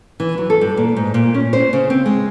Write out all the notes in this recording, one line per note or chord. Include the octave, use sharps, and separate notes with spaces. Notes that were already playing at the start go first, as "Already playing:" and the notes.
E3
F#3
A4
G2
A#2
G#2
A#2
C#4
C5
C#3
C4
G#3